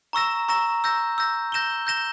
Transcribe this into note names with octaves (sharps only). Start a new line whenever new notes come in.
A#5 C#6 E6 A#6 E7
A#5 C#6 E6 A#6 E7
E6 G6 A#6
E6 G6 A#6
G6 A#6 E7 G7
G6 A#6 E7 G7